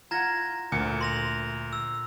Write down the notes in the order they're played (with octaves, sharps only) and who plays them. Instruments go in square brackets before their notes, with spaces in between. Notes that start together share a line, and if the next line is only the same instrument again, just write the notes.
[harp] F4 F#5 [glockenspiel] A#5 G#6 A#6
[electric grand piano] D2 C#7 [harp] A#2
[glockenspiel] C6 A#6 F7
E6